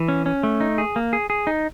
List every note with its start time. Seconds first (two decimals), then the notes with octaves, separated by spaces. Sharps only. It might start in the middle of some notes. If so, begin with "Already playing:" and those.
Already playing: E3
0.08 C#4
0.26 C#4
0.43 A3
0.61 D#4
0.78 G#4
0.96 A#3
1.13 G#4
1.30 G#4
1.47 D#4